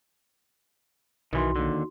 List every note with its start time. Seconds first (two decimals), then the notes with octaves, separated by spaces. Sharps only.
1.33 B1 D#3 E3 D#4 F#4 C6
1.56 D#2 D3